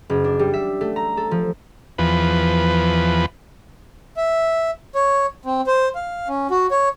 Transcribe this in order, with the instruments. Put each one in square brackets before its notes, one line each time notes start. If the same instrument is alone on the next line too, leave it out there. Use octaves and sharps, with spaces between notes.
[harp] F#1
D4
G3
E5
A3
A#5
A4
F3
[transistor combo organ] E2 F3 B4
[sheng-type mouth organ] E5
C#5
C4
C5
F5
C#4
F#4
C#5